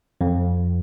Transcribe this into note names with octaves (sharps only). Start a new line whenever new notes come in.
F2